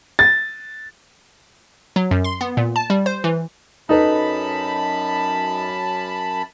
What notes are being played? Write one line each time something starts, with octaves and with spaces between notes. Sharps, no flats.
A6
F#3
F#2
C6
B3
A#2
A5
G3
C5
E3
F#2 D#4 A4 B4 A5 B5